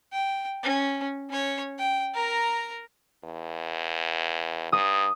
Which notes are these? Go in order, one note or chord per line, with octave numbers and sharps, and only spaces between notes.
G5
C#4
C#4 C#5
G5
A#4 A#5
E2
G2 D#6